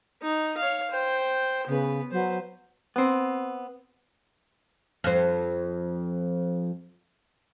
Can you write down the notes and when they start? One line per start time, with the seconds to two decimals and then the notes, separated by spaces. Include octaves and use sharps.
0.22 D#4
0.58 C#5 F5
0.91 C5 G5
1.67 C#3 B3 B4
2.12 F#3 B4 C5
2.96 B3 C4
5.04 F2 C5